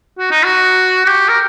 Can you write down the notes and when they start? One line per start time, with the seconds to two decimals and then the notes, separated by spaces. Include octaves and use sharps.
0.19 F#4
0.31 D#4
0.44 F#4
1.05 F#4
1.08 G4
1.28 A#4